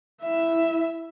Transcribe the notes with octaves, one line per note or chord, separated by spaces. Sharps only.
E4 E5